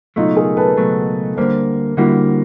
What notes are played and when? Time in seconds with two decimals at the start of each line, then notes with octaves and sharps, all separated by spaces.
0.16 C#2 B2 F#3 A3 D#4 F4
0.37 G#4 A#4
0.57 A4 B4
0.77 C#2 B2 F#3 A3
1.37 D2 D3 G3 A#3 A#4 C5
1.97 D3 G3 A#3 E4 F#4